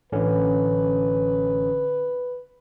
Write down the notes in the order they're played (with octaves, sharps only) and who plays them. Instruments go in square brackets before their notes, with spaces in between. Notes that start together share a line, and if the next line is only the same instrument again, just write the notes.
[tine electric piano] A1 D3 C#4 [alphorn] B4